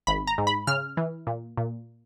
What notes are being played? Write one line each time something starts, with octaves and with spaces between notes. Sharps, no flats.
G#1 B5
A#5
G#2
B5
C#3 F6
E3
A#2
A#2